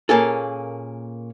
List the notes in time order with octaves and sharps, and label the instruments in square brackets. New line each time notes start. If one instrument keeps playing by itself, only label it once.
[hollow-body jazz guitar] A#2 A#3 C#4 G#4 A4